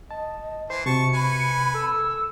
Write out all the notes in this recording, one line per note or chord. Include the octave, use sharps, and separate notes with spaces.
D#5 A5
E3 C5 C7
C3 F#4 A5 C#6 C#7
B4 G#5 B5
A4 E6